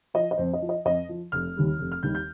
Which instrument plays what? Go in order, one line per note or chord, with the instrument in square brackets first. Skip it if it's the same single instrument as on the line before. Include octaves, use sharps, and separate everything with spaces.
[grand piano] F3 D#5
D#5
F2 C5
D#5
F3
D#5
F2 D#5
F3
F1 F6
D#2 D#3 G3
F1
F6
D#2 D#3 G3 G6
G6